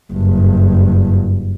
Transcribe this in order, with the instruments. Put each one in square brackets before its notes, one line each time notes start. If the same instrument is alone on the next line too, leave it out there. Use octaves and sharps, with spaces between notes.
[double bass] F#1 G2